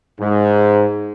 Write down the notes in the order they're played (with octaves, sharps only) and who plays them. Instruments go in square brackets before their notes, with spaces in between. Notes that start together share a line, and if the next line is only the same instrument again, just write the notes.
[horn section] G#2